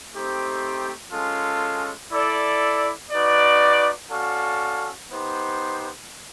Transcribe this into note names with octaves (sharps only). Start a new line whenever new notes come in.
A3 C4 D#4 G4 C5
G#3 C#4 F4 A4
E4 A4 D5
D#4 F#4 B4 D5
C#4 F#4 A4 D5 F5
B3 D#4 G4 C5